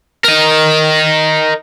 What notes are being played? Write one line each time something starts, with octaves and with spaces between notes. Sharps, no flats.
A#4 D#5